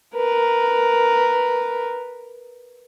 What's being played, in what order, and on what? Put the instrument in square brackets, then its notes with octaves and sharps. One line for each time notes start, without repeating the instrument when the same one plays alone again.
[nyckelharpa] A#4 B4